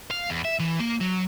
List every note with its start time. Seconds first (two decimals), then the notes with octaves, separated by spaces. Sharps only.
0.11 F5
0.30 E2
0.44 E5
0.60 E3
0.80 A#3
1.01 F#3